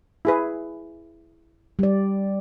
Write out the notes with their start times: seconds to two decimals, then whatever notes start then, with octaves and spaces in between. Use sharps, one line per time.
0.25 E4 G#4 B4
1.79 G3 D5